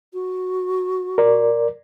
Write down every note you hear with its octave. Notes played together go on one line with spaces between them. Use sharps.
F#4
A#4 D5